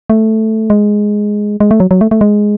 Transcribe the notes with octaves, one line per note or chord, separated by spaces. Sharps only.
A3
G#3
G#3
A3
F#3
F#3
A3
A3
G#3